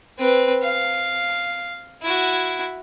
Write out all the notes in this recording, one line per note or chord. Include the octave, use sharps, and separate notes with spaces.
C4 B4
F5
E4 F#4